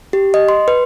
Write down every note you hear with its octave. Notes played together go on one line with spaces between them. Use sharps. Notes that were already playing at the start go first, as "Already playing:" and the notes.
G4
D#5
C6
B4